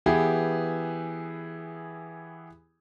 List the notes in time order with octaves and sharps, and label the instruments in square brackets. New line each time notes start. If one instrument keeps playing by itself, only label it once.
[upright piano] E3 B3 E4 G4 G#4